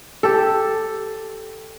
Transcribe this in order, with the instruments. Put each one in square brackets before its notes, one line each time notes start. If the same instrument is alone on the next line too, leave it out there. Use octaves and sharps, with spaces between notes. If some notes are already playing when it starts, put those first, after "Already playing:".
[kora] G4 A4